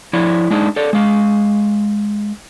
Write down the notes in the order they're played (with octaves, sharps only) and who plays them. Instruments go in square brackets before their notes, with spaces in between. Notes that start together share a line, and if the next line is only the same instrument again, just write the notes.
[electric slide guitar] F3 E4 C#5 D5
G#3 D4 D#4
A4 C#5 D5
G#3 F5